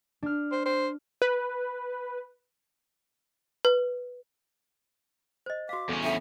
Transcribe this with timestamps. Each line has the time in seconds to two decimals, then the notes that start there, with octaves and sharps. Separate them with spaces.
0.22 D4 F6
0.52 C5
0.65 C5
1.22 B4
3.65 B4
5.46 C5 D#5
5.69 F#4 F5 D6
5.89 E2 C#4 A4
6.04 D4 F4 A4 E5